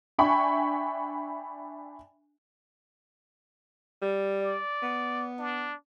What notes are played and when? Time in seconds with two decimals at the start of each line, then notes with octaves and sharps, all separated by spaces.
0.18 D4 E5 G5 G#5 B5 C#6
4.02 G3
4.41 D5
4.82 B3
5.38 D4